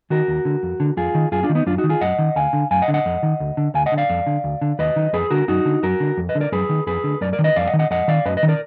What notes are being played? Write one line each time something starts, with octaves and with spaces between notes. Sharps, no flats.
D#3 F#4 A#4
D#2
D3
F2
D3
F2 F4 G#4
D#3
F#2 F4 G#4
D4 F4
D#3
B3 D#4
F#2 D4 F4
D#4 F#4
D#3
F4 G#4
F#2 D#5 F#5
D#3
D2 F5 G#5
D3
F#2 F5 G#5
D#5 F#5
D3
D#5 F#5
F2
D#3
D2
D3
D2 F5 G#5
D#5 F#5
D3
D5 F5
F2
D3
D2
D3
D#2 B4 D#5
D#3
F2 G#4 B4
D3 F#4 A#4
F#2 D#4 F#4
D3
F#2 F#4 A#4
D3
F2
B4 D#5
D3
A#4 D5
F#2 G#4 B4
D#3
F2 G#4 B4
D3
F#2 A#4 D5
A#4 D5
D#3
B4 D#5
F2 D5 F5
D#5 F#5
D#3
D#5 F#5
F2 D#5 F#5
D#3 D5 F5
F#2 B4 D#5
B4 D#5
D#3
A#4 D5